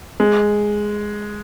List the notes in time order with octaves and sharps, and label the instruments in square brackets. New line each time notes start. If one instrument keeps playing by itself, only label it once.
[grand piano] G#3